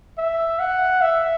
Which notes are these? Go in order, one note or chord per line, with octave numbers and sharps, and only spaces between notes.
E5
F#5
E5